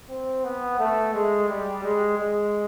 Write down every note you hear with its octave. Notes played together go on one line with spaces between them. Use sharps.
C4
B3
A3
G#3
G3
G#3
G#3